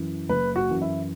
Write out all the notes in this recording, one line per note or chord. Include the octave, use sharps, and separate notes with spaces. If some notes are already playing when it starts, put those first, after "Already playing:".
Already playing: F#2 E3
F#1 B4
F#4
F#2 E3
E4